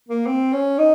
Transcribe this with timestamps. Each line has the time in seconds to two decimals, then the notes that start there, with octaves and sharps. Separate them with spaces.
0.09 A#3
0.27 C4
0.52 C#4
0.79 D#4